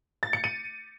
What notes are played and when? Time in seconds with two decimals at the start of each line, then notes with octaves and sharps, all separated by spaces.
0.23 A6
0.33 C#7
0.44 D#7